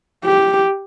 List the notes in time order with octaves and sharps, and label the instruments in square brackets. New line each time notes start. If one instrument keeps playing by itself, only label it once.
[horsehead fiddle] G4